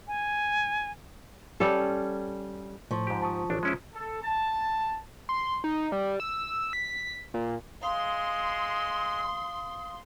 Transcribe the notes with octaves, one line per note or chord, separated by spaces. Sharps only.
G#5
G3 C#4 A4
A2 F3 C#6
G#2 G4
A5 C#6 D#6
A1 D4
G#3 C#4 E4
A4
A5
C6
D#4
G3
E6
B6
A#2
G#3 F5 C6 D#6